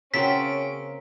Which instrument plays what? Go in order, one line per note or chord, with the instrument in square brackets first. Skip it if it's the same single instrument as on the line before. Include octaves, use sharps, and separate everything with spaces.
[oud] C#3 F#4 [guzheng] A#3 C4 A5 [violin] C#4 D7 [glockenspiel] B6